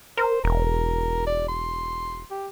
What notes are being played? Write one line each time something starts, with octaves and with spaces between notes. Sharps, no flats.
A#4 C5
E1 A#4
D5
C6
G4